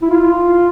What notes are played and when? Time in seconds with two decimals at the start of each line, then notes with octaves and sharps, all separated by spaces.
0.02 E4
0.10 F4